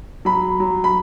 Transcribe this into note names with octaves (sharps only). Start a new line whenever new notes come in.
F#3 B5
F#3
B5